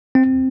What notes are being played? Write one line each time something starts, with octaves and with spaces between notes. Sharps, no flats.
C4